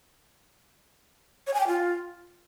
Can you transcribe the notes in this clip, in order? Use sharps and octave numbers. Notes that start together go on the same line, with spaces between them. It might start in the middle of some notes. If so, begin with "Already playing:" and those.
C#5
G#5
G5
F4